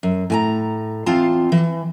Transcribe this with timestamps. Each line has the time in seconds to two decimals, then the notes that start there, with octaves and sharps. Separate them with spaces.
0.03 F#2
0.30 A2 G#5 A#5
1.06 E2 C4 F4 F5 A5
1.52 E3